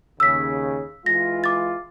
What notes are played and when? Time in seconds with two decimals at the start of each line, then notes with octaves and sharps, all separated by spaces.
0.20 D#2 C#3 E6 B6
1.06 E3 G#3 F4 A#6
1.44 D6 A6